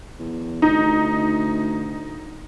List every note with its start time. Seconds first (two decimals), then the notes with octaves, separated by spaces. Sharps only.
0.19 E2
0.62 D2 D#4